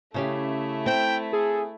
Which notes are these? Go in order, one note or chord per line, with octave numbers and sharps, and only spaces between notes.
C#3 A3 C#4 E4 G4
C4 G5
G#4 A4